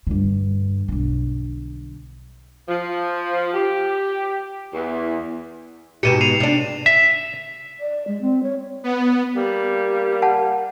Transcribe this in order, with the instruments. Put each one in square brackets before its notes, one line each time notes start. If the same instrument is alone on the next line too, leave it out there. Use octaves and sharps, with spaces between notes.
[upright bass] G2 D3
B1 D3
[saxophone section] F3
G4
E2
[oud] G#2 B2 G4 [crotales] C#7 D#7 E7
[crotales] C7 D#7 F7
[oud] C3 D4
[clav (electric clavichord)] E5
[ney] D5
G#3
C4
C#5
[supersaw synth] B3
[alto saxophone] G3 [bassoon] A#3
[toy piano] F#5 A5